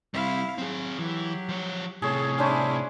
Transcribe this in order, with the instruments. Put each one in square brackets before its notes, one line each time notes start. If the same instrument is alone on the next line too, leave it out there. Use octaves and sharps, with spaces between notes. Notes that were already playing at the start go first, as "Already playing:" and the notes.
[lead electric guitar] G3 C4 [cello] E4 F5
[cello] F#3 [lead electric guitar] C4 G#4
[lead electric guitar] E3 [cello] F#3 G4
[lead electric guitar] F3 C#5
[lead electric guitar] A2 C3 [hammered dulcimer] G#4 C#5 [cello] A4
[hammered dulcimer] C#4 D4 C5 [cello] E4 G#4